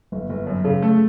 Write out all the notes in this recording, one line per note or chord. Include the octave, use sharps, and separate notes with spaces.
G1
G1
F#2
C#3
A3